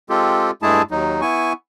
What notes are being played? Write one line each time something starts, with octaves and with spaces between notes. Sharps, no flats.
G#3 C4 F4 G4 A4
G2 G#3 A3 E4 G#4 A5
D#2 F#3 D#4
B3 E4 G#5 C#6